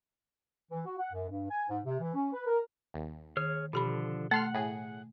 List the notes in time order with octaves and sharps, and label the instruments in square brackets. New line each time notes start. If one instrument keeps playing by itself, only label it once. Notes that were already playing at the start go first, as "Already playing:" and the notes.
[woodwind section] E3
F#4
F#5
F#2
G2
G#5
G#2
C3
E3
C#4
B4
A#4
[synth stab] D#2
[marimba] D#3 [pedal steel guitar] G#4 C#5 F6
[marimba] B2 G4 B5 [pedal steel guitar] D3 F3
[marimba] A3 [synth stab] A4 C6 F6 [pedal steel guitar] F#5
[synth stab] A2 G#4